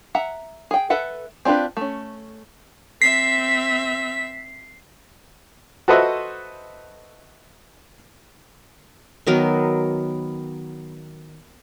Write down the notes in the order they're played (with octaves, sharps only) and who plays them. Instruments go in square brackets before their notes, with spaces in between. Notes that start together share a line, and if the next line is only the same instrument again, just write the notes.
[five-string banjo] E5 F#5 A#5
G#4 G5
A4 B4 E5 F#5
C4 D4 F4 G4 B4
A3 C#4
[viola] C4 E5 [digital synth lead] B6 [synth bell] C7
[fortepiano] F#4 A4 B4 C5 D#5 E5
[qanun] D#3 F#3 B3 A#4